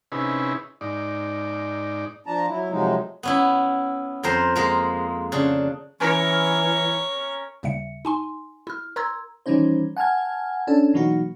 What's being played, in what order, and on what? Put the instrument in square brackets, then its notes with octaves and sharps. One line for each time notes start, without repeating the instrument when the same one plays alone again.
[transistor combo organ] C3 C#4 D#4 E4 G#4 B4
G#2 D#4 D5
[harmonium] F3 D4 A5 A#5
F#3 E4
F2 C3 F3 F#3 G#3 D#4
[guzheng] B3 C#4 E4
F2 A#4 C5
G#3 A#3 A#4
C#3 D4
[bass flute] E3 [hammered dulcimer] C#4 A#4 [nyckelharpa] C#5
[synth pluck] D#2 C#3 G3 E5 C#7
D#4 G#5 C6
E4 F6
A#4 A#5 C6 E6 G#6
[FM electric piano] D#3 E3 G3 C#4 D#4 C5
F#5 G#5 A5 F6 G#6
C#4 D4 A4
B2 E3 F#3 A#3 D#4 F#4